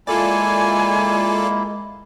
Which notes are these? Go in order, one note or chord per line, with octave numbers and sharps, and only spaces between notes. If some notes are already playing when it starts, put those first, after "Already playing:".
G#3 A#3 E4 F4 A4 D5 G#5